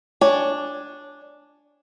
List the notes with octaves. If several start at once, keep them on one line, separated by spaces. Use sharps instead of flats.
D4 C#5 G#5